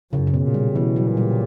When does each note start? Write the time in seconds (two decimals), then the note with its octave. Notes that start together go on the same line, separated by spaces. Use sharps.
0.12 F#2 C#3
0.27 C#3
0.34 B2
0.43 A#2
0.54 G3
0.75 B2 E3
0.96 F#3
1.07 A#2
1.17 G3